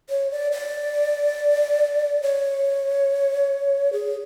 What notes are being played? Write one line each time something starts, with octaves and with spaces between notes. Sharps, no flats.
C#5
D5
D5
C#5
G#4